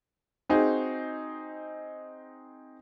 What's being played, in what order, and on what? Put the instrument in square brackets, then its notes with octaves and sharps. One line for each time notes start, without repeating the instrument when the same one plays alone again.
[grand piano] C4 D#4 F#4 G#4